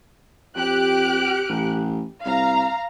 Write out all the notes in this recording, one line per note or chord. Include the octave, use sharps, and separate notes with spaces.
F2 G4 F#6 D7
A1
C2 F5 A#5